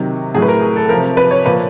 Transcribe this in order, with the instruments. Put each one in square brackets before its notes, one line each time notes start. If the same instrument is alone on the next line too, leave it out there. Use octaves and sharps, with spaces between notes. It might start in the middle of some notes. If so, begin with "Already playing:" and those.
Already playing: [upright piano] C3 D#3 F#3
A2 F#3 G#4
B4
A#4
G#4
A4
C3 F3 A#4
B4
C#5
A#2 F3 B4